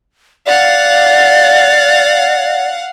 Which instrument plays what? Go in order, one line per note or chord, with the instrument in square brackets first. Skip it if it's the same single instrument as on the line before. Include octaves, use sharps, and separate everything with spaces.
[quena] D5 [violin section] F5 F#5